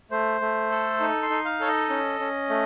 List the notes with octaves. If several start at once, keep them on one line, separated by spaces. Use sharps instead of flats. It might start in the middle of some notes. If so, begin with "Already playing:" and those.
A3 C5
A3
A4
D#4
C6
D#4
F5
A4 C#5
D#5
C#4
C#4
A3